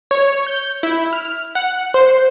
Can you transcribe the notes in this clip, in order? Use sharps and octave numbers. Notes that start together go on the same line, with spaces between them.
C#5
G6
E4
F6
F#5
C5